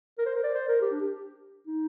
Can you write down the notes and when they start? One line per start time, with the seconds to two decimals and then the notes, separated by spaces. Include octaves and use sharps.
0.18 A#4
0.26 C5
0.35 A#4
0.44 D5
0.54 C5
0.68 A#4
0.82 G4
0.91 D4
1.01 G4
1.67 D#4